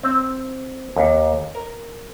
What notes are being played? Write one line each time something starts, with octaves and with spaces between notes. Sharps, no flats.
C4
D#2
A#4